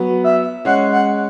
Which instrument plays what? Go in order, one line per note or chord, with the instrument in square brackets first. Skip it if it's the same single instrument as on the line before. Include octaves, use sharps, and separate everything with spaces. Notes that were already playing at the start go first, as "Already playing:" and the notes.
Already playing: [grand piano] F#3 B3
[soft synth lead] E5
[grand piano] G#3 C#4 [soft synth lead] F#5
[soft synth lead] F#5